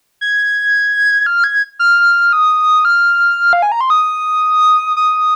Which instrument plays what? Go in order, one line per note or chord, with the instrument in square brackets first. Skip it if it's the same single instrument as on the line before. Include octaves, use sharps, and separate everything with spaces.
[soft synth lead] G#6
F6
G#6
F6
D#6
F6
F5
G#5
A#5
C6
D#6
D#6